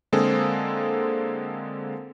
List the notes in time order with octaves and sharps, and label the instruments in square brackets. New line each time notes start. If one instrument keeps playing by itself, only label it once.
[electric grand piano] D3 G#3 A#3 C4 G#4 A4